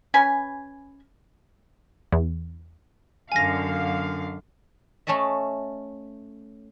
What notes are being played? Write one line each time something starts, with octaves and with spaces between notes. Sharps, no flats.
C#4 B4 G#5 B5
E2
F#2 D3 F5 G#5 A#6
A3 C#4 A4 D#5 E5